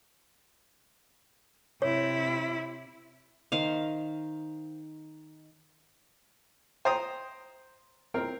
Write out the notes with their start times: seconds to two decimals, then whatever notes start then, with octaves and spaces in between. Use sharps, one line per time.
1.82 C3 E4 C#5
3.52 D#3 C5 F5
6.85 C5 G5 A#5 D#6
8.14 C4 A#4